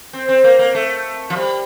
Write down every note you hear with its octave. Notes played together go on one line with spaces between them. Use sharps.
C4
C4
A#3
A#3
A3
F3
G3